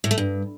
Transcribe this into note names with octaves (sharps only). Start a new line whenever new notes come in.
A2
A3
G2